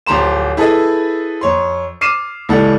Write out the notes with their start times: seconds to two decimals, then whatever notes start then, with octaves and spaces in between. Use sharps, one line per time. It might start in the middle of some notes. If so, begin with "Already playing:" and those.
0.06 D1 F3 G4 A#5 C6 E7
0.57 E4 G#4 A4 B4 D#5
1.41 F2 C#5 C6
2.01 D6 F6 C7 D#7 E7
2.49 C#2 E3 G3 A4 F#5